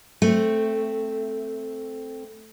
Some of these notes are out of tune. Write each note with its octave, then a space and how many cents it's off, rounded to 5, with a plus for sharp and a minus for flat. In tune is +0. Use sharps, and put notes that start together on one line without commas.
A3 +0 C4 +0